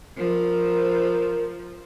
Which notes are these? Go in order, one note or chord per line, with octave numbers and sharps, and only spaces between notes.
F3 A#4